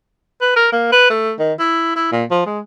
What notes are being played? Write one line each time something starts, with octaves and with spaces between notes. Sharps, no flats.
B4
A#4
A#3
B4
A3
D#3
E4
E4
A#2
F3
G#3